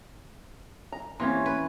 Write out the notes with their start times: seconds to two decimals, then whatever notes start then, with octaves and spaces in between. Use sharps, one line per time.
0.92 A#5
1.20 E3 A#3 C4 C#4 G4 C6 G#6
1.46 B4